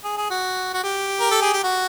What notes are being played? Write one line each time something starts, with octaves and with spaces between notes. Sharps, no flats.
G#4
G#4
F#4
F#4
G4
A#4
A4
G#4
G4
F#4